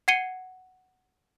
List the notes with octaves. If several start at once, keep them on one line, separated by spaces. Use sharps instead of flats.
F#5 G#6 C7 C#7 D#7 G7